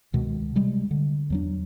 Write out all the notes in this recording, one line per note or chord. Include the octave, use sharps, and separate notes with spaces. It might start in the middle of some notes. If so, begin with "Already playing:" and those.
C#2 B2 D#3 G#3
C3 G3 G#3
D3
E2 F#3 D4